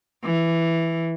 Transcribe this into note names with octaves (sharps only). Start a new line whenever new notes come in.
E3